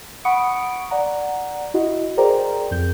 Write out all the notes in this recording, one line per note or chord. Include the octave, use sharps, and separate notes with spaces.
F#5 B5 C#6 D#6 C#7 D7
D5 F#5 A#5
E4 F#4 D#5
G#4 A#4 C5 D5 G5 A#5
F2 G6